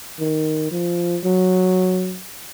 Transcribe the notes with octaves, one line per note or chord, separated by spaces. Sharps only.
D#3
F3
F#3